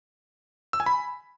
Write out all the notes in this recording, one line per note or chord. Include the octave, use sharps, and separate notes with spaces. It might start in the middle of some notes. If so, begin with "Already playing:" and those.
E6
G#5
B5